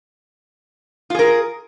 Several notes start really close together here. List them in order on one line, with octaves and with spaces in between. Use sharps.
F4 G#4 A#4